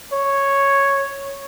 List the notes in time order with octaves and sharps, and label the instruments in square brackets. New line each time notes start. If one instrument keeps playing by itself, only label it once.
[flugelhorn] C#5